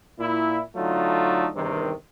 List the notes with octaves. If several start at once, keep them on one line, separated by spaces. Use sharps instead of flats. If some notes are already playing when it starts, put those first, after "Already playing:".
A#2 E4
D3 F#3 A3 D#4 F4
E2 G2 C3 D#3